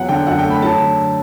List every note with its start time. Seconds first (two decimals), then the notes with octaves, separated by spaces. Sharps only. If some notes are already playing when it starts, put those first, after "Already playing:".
Already playing: E2 F#3 F#5
0.09 D3 G5
0.27 F#2 F#5
0.39 G5
0.44 A3
0.51 B5
0.62 F#3 A5
0.81 D3